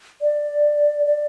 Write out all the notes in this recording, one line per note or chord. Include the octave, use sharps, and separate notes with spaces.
D5
D5